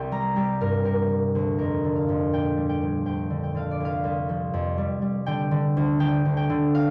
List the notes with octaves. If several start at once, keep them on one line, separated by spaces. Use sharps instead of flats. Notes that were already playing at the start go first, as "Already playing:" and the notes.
Already playing: C2 G5
G3 A#5
G3 G4
G2 A#4
C3 A#4
C3
D2
F2 A#4
D3
F5
F2
A#2 G5
G3
G5
A#2
D2 G5
D3
G5
D3 F5
D5
C2 F5
C2
F3
F2
G3
G3
D3 G5
D3
D2
D3 G5
D2
G5
D3
F5